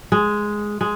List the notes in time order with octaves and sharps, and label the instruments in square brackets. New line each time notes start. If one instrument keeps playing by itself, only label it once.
[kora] G#3
G#3